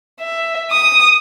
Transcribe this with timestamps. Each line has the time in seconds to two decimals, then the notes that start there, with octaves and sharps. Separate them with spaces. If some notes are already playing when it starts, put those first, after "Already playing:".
0.20 E5
0.72 D#6